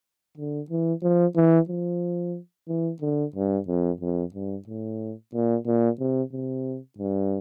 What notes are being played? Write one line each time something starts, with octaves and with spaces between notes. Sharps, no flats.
D3
E3
F3
E3
F3
E3
D3
G2
F2
F2
G2
A2
A#2
A#2
C3
C3
G2